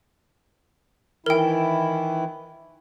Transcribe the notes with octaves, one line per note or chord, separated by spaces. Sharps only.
D#3 E3 E4 A#4 G5